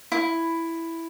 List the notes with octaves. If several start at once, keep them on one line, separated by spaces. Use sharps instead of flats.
E4